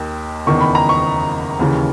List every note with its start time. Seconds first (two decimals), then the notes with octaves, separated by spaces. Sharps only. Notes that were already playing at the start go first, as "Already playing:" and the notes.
Already playing: D#2 D#3
0.46 F#1 E2 D#3 C#6
0.61 B5
0.75 A#5
0.89 C#6
1.59 D#2 C#3 E3